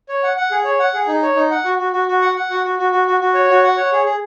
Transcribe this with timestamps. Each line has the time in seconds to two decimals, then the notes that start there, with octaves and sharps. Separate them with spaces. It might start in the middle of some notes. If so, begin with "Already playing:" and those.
0.09 C#5
0.23 F#5
0.37 F#5
0.51 G#4
0.65 C#5
0.80 F#5
0.94 G#4
1.08 D#4
1.22 C#5
1.36 D#4
1.51 F#5
1.65 F#4
1.79 F#4
1.93 F#4
2.08 F#4
2.22 F#5
2.36 F#5
2.50 F#4
2.65 F#4
2.79 F#4
2.92 F#4
3.07 F#4
3.20 F#4
3.35 C#5
3.50 F#4
3.64 F#5
3.77 C#5
3.92 G#4
4.06 G#4